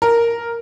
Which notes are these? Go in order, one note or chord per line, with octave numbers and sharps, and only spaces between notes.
A#4